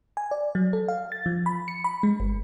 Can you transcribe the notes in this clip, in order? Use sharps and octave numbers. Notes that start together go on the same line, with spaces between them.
G#5
D5
F#3
A4
F5
A6
F3
B5
C#7
B5
G#3
G1